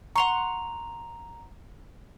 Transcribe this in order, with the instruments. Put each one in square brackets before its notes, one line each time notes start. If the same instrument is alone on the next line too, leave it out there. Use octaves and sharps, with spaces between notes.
[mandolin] F#5 C6 C#6 [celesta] A#5 F7